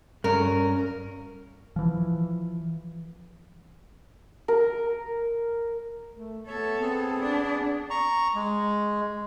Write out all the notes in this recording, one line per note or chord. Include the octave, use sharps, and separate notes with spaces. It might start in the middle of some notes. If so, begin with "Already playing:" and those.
G2 C#4 A#4
E3 F3
A#4
A3
B3 A4 C#5 E5
B3 C4 G#4
D4
A#5 C#6
G#3